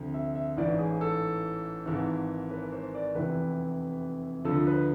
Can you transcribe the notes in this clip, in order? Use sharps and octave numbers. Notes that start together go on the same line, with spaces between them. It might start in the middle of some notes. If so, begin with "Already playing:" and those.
Already playing: D2 C3 F3
E5
E5
A1 G#2 E3 D5
G#4
A4
G#1 G#2 E3
B4
C5
D5
F1 E2 C3 E3 B4
D2 D3 F3 A4
B4